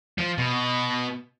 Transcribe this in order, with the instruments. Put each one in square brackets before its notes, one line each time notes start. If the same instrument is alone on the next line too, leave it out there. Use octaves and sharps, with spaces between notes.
[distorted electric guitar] F3
B2